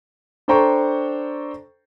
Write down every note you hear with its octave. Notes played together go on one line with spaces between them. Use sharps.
D4 A4 C5 G5 A#5 C#6